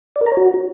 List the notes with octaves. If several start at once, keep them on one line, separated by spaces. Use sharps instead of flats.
D5
A#4
A#5
C#5
F#4